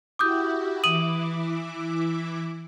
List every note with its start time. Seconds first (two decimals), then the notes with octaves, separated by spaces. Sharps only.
0.19 E4 F#4 G4 D6 D#6 G6
0.84 E3 E4 D6 D#6 D#7 F#7